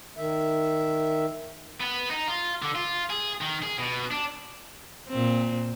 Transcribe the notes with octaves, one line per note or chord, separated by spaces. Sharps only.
D#3 E5
B3
D#4
F4
D3
F4
G#4
D#3
G#4
B2
D4
A#2 C4